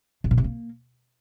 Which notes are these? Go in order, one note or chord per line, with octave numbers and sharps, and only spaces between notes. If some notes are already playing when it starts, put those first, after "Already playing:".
C3
B2
C3
A#3